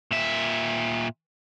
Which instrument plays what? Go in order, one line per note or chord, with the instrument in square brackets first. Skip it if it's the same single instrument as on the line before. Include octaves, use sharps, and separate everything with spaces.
[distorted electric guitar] A#2 E5